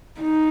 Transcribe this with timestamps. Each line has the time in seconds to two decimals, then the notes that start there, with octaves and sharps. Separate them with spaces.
0.20 D#4